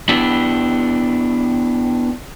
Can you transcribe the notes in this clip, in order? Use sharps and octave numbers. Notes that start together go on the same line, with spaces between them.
B3 D4 E4 G4